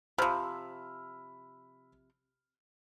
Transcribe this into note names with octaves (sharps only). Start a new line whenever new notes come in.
C3 F3 B5 E6 F6